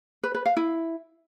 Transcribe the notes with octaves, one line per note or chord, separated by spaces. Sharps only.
B4
B4
F5
E4